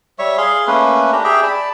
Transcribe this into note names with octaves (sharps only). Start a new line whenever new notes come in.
G3 C#5 E5 C#6
G#4 F5 C6
A3 A#3 C#4 B4
D4 G4 A#5
G4 G#4 E5 G5
D5 A5 B5